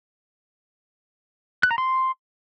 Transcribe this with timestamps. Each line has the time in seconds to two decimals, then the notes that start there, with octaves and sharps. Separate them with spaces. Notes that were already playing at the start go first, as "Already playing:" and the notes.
1.63 F#6
1.71 A#5
1.78 C6